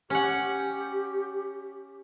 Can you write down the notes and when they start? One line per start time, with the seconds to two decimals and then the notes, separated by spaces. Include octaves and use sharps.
0.10 C#4 G4 F#5